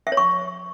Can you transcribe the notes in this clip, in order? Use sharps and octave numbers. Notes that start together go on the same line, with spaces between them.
E5
C#5
C#6